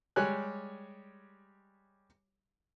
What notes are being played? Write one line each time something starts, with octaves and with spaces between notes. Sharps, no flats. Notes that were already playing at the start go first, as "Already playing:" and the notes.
G3 G#3 G4 C#5 G#5 F#6